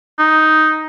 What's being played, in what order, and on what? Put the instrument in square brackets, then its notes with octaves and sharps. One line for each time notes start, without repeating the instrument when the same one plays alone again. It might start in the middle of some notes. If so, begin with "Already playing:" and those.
[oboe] D#4